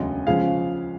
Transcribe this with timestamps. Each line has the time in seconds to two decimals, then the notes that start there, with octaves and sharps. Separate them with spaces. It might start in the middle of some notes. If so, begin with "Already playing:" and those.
Already playing: E1 D2 C#3 F#3 D#5
0.27 C#3 F3 G#3 F5